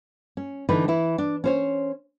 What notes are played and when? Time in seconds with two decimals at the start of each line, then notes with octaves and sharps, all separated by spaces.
0.37 C#4
0.69 D3 E3 D#4 B4
0.88 E3 E4
1.18 D4
1.44 C#4 C5 C#5